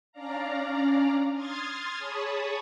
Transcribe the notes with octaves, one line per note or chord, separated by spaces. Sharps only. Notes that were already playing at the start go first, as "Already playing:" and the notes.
C#4 D4 D5 F5 A#5
C6 D#6 F6 G#6 A6
G#4 C#5 A5 B5 C#6 D#6